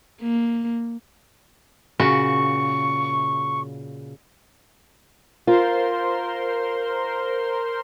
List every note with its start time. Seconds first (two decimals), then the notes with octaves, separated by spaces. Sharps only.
0.22 A#3
1.99 A#2 C#3 F#4 C#6
5.47 F4 A#4 C5 C6